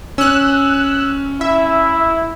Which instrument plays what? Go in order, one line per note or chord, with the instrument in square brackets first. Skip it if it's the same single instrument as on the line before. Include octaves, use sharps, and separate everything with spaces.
[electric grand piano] C#4 [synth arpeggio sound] E6 F#6
[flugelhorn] E4 [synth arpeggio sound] E5